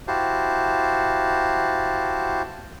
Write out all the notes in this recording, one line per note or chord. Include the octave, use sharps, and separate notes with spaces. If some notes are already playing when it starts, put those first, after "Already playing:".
E4 F#4 G4 C5 F5 A5